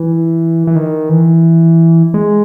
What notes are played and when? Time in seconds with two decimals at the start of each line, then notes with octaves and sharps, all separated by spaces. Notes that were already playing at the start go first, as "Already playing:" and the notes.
Already playing: E3
0.67 E3
0.76 D#3
1.09 E3
2.14 G#3